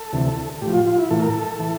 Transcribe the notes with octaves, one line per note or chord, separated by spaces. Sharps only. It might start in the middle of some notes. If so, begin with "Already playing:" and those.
Already playing: A4
D2 C3 E3
A2 G4
F3
F4
F4
E4
A2 E3 A4
A#4
A4
E3